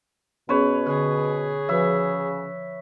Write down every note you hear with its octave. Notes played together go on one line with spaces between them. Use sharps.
B2 B3 C#4 G#4 B4 C#5
D3 G#4
C#3 F3 F#4 B4 E5